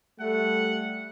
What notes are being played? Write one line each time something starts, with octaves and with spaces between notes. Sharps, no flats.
G3 A3 F#5